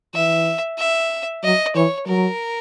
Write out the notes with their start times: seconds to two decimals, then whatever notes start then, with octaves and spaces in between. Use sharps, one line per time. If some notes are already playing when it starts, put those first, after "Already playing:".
0.14 E3 E5
0.78 E5
1.43 F#3 D#5
1.75 E3 C#5
2.07 F#3 A#4